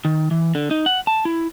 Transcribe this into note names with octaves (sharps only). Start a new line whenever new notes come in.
D#3
E3
D3
D#4
F#5
A5
E4